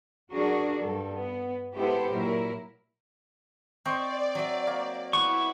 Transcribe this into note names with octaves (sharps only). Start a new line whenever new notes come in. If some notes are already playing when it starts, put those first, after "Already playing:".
F#3 D4 F#4 G#4 A#4
G2 A4
B3
G#3 B3 E4 G4 A4 C5
A#2 F#3 E4 A#4
C4 C5 D5 D#5 C#6
F#3 E5
A#3
B3 E4 C#6